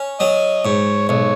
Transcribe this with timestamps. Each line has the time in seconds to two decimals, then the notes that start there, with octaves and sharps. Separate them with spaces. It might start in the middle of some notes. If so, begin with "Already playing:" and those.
Already playing: C#4
0.20 F#3 D#5
0.65 G#2 C#5
1.09 B1 C#5